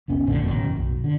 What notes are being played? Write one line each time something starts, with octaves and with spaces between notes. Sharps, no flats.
F1 C2 B3 C#4
A#1 F2 A2 D3
A1 F#2 B2 D#3
B1 F#2
D3